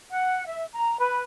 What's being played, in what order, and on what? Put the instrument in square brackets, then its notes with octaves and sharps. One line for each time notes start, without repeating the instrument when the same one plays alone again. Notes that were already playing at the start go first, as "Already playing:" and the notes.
[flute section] F#5
E5
A#5
B4